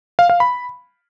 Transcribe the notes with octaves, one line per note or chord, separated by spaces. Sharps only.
F5
F5
B5